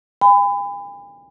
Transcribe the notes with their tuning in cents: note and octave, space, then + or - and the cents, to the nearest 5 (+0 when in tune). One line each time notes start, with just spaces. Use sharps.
G#5 -45 B5 +30